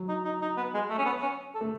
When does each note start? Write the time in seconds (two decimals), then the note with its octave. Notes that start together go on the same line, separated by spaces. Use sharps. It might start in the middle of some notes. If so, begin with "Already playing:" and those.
Already playing: F#3
0.08 D#4
0.25 D#4
0.42 D#4
0.57 B3
0.74 G#3
0.90 A3
0.98 C#4
1.05 B3
1.22 C#4
1.55 A4
1.61 A3